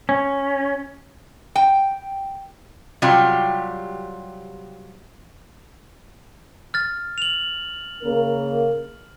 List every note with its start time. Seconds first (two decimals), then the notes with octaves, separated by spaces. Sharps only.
0.09 C#4
1.56 G5
3.02 C3 F#3 G3 F4 G4
6.74 F6 A6
7.18 F7 F#7
8.02 C#3 A#3 A#4